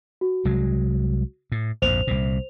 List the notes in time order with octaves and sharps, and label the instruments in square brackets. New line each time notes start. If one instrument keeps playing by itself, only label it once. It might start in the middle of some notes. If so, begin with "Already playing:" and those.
[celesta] F#4
[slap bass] C2 F#3 G#3
A2
[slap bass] A#1 F2 G#2 [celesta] C5 F7
[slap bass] C2 A#2